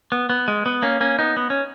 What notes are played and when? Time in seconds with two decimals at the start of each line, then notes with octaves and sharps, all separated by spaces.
0.12 B3
0.30 B3
0.48 G#3
0.66 B3
0.82 A#3 C#4
1.01 A#3 C#4
1.19 B3 D#4
1.37 B3
1.50 C#4